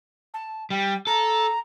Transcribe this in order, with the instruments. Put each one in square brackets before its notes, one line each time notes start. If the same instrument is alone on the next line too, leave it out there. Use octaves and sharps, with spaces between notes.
[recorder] A5
[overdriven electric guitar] G3 [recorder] G5
[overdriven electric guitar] A4 [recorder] A#5